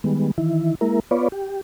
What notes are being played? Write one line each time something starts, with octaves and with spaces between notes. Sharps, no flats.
D#3 G3 G#3 B3
D#3 E3 E4
G#3 A#3 E4 A#4
B3 F4 B4 C#5 D5
G4